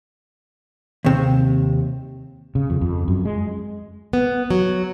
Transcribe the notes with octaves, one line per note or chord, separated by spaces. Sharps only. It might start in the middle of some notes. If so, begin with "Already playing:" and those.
D#2 C3
C#3
F2
F2
F#2
G#3
B3
F#3